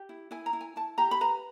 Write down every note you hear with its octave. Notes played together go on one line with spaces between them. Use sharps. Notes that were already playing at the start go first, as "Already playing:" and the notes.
Already playing: G4
E4
E4 G#5
A#5
E4
G#5
E4 A5
G4 A#5
B5
B4 A#5